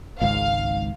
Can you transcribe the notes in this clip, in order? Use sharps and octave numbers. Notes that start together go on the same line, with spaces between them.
G#1 C#2 G#2 F5